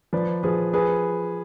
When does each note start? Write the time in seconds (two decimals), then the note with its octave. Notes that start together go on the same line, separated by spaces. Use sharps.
0.13 F3 B4 D5
0.43 F3 G#4 B4
0.73 G#4 B4